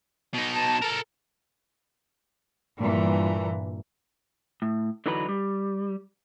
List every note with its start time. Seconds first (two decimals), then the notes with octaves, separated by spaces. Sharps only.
0.34 B2 D#4
0.53 A5
0.82 A4 A#4
2.79 G2 A#2 E3
4.62 A2
5.06 D3 E3 F#3 D#4 F#4 B4
5.29 G3